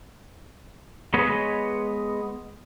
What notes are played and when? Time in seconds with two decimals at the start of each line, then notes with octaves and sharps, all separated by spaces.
1.14 G#3 B3 B4 C#5 D#5